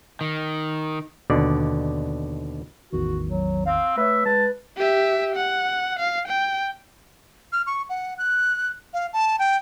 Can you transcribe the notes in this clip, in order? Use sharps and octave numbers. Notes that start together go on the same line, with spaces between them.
D#3
D#2 B2 D3 D5
A1 E2 D#3 F#4
F#3
C4 F5
A3 B4 C#5 E5
G#3 B4 A5
G4 E5
F#5
F5
G5
F6
C#6
F#5
F#6
F5
A5
G5